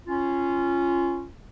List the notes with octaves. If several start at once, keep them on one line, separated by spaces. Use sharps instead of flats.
C#4 F4